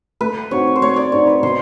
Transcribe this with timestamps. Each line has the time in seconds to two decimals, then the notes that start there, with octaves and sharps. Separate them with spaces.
0.21 A3 B4
0.51 C4 D#4 F#4 C#5
0.76 C5
0.82 A3 C#5
0.96 D5
1.12 C4 D#4 F#4 C#5
1.27 B4
1.43 B2 C5